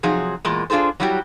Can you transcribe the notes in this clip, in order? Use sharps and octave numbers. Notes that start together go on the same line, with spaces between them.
C3 F3 F#3 D#4 G#4
E2 A#2 G#3
D4 F4 G#4 A4 C5
F#3 G3 E4 F#4 G4